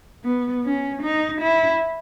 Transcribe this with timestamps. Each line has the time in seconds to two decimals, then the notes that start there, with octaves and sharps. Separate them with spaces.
0.24 B3
0.64 C#4
1.02 D#4
1.41 E4